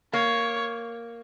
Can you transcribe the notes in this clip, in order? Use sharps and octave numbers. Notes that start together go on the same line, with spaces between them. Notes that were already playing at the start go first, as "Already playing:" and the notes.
A#3 C#5